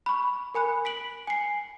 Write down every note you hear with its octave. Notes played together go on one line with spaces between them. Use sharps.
B5 C#6
A#4 G#5 B5 F#6
B6 D7 F#7
G#5 C7